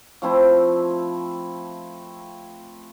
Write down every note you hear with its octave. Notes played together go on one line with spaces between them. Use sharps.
F3 A3 C4 E4